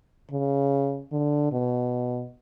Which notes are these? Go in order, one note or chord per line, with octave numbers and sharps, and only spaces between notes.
C#3
D3
B2